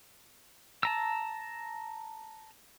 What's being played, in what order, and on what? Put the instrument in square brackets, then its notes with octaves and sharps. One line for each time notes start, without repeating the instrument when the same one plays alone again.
[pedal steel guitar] A5 A#5 E6